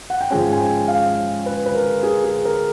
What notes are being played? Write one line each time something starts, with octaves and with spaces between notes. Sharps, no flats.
F#5
G5
G#2 F3 G#3 C#4 G#5
G#5
G5
F5
B4
B4
A#4
G#4
G#4
A#4